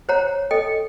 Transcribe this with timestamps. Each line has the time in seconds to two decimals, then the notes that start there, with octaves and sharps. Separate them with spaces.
0.09 C5 C#5 F#5 A#5
0.51 A4 D#5 G5